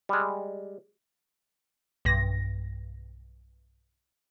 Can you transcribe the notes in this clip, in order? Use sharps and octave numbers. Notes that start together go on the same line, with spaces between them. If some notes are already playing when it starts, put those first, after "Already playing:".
G3 G#3
B1 G2 A#6